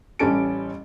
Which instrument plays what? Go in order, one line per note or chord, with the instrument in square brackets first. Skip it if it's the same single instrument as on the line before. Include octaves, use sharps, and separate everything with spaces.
[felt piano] A1 G3 C#4 A4 D7